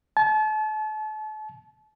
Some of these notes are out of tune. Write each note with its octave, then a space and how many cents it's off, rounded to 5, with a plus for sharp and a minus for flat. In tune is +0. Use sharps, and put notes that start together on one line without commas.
A5 -35